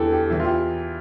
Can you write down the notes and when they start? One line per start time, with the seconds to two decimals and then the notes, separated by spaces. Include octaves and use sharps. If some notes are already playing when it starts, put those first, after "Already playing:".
Already playing: E2 D3 G4 A4
0.12 G4
0.30 E2 E3
0.40 F4
0.45 G4